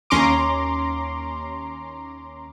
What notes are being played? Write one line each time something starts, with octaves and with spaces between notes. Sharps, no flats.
D#2 C#4 A#5 C6 D6